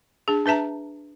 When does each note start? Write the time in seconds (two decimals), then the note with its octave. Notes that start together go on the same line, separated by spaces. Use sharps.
0.28 D4 G#4
0.46 D4 B4 E5 A5 A#5